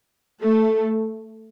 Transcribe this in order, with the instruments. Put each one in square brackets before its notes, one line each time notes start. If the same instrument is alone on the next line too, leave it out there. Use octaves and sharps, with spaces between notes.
[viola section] A3 A4